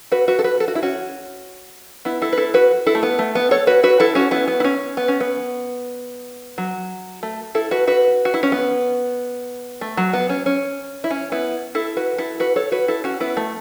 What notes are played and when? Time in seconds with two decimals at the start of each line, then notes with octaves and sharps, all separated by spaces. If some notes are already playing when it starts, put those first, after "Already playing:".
0.12 F#4 B4
0.28 F#4 B4
0.39 A4
0.44 F#4 B4
0.60 A4
0.68 F#4
0.75 E4
0.83 C#4 F#4
2.05 B3 E4
2.22 E4 A4
2.33 B4
2.37 E4 A4
2.54 F#4 B4
2.86 E4 A4
2.95 A3
3.03 B3
3.19 A3
3.35 B3
3.51 A4 C#5
3.67 F#4 B4
3.83 F#4 B4
4.00 E4 A4
4.15 C#4 F#4
4.31 B3 E4
4.48 B3
4.60 E4
4.64 C#4
4.97 B3
5.08 C#4
5.20 B3
6.58 F#3
7.23 A3
7.55 E4 A4
7.71 F#4 B4
7.87 F#4 B4
8.25 F#4
8.34 E4
8.43 C#4
8.52 B3
9.81 A3
9.97 F#3
10.13 B3
10.29 C#4
10.46 C#4
11.04 E4
11.11 C#4
11.32 B3 E4
11.75 E4 A4
11.97 F#4 B4
12.18 E4 A4
12.40 F#4 B4
12.56 A4 C#5
12.72 F#4 B4
12.88 E4 A4
13.04 C#4 F#4
13.20 B3 E4
13.37 A3